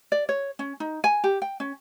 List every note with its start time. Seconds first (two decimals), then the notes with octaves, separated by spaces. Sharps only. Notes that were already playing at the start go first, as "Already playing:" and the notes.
0.12 D5
0.29 C#5
0.59 C#4
0.80 D#4
1.04 G#5
1.24 G4
1.42 G5
1.60 C#4